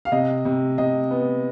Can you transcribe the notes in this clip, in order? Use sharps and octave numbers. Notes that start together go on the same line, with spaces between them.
F5
C3 D#5
C3
C3 D#5
B3